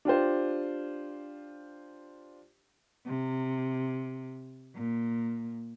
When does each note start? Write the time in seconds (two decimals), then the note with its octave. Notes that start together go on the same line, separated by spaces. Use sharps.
0.05 D4 F4 G4 C5
3.07 C3
4.75 A#2